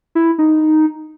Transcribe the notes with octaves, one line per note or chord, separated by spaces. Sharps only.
E4
D#4